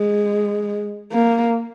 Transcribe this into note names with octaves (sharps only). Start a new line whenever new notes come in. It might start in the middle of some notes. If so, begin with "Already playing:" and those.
Already playing: G#3
A#3